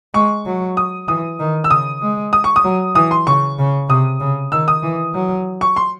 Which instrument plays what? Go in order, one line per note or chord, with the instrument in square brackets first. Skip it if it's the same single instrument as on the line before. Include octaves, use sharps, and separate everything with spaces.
[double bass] G#3 [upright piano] C#6
[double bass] F#3
[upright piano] D#6
[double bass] E3 [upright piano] D#6
[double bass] D#3
[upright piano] E6
[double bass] C#3 [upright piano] D#6
[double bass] G#3
[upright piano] D#6
C#6
D#6
[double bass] F#3
[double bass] E3 [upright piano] D#6
[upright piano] C6
[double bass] C#3 [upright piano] C#6
[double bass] C#3
[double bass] C3 [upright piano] D#6
[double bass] C#3
[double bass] D#3 [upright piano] E6
[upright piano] D#6
[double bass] E3
F#3
[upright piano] C#6
C6